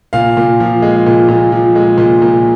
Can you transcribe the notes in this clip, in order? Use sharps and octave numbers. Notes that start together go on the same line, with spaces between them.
A#2 F5
A#2
F3
G#3
A#2
A#2
F3
G#3
A#2
A#2